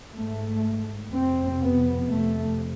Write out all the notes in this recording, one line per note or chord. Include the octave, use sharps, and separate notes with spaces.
G#2 A3
F2 C3 C4
B3
F2 C3 A3